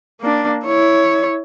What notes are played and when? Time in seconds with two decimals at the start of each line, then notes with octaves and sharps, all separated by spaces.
0.21 A#3 D4
0.66 E4 C#5